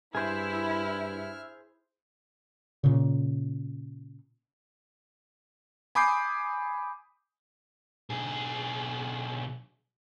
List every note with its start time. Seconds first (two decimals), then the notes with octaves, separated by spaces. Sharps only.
0.15 G2 E4 G#4 C5 E5 F6
2.84 A#2 C#3
5.95 G#5 B5 D6 D#6 G6 C7
8.10 B1 G#4